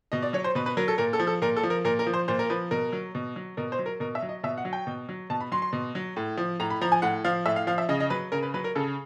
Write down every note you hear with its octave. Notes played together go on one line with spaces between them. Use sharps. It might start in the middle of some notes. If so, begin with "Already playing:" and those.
B2 D#5
D5
F#3 C#5
C5
B2 B4
B4
F#3 A#4
A4
A#2 A#4
A4
F3
A4
A#2 A#4
A4
F3
A#4
A#2 A#4
A#4
F3
C5
A#2 C5
A#4
F3 B4
B2 A#4
F#3
B2
F#3
B2 A#4
C5
F#3
A#4
B2 A#4
E5
F#3
D#5
B2 E5
F#5
F#3
G5
B2
F#3
B2 A5
B5
F#3 C6
C6
B2
F#3
A2
F3
A2 A#5
B5
F3 A#5
G#5
A2 F#5
F3 F5
A2 E5
F5
F3 F5
E5
C#3 D#5
D#5
F#3 B4
C#3 A#4
B4
F#3 B4
A#4
C#3 A4